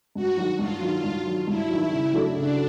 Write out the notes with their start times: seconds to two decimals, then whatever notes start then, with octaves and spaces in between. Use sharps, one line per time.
0.15 G2 F#4
0.37 D#3 F#3
0.59 G2 F4
0.81 D#3 F#3
1.03 G2
1.25 D#3 F#3
1.48 G2 E4
1.70 D#3 F#3
1.91 C#3
2.13 F#3 A3 D4 F#4
2.36 C#3 D4